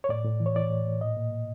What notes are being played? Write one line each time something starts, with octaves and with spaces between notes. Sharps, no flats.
C#5
A2 D5
A2
E3
C#5
E3 D5
A2
A2
A#2 D#5
A#2
A#2